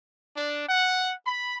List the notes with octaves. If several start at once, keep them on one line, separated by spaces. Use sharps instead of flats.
D4
F#5
B5